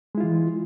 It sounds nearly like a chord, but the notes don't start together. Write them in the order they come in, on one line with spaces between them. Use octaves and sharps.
G#3 E4 F4 E3